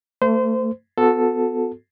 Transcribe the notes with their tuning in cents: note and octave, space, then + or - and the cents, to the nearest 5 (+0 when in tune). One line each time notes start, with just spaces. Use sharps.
A3 +30 C5 -25
B3 +30 F#4 -25 A4 +0